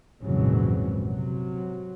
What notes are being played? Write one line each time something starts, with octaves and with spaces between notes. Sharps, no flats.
G#1 F2 A#2 C#3 E3 F#3
C3 F#3